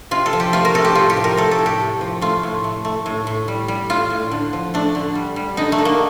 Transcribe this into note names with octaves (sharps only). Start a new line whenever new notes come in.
C3 F4
A4
F3
G4
A3 F4
A#4
C3 A4
G4
A2 F4
G4
F3
A#4
A3 A4
A4
A2
G4
A2
F3
A3 F4
A2
A3
A3
A2
A2
G3
G3
A2 F4
A2
D3
F3
A3 D4
D3
G3
G3
D3 D#4
A3
D3
A#3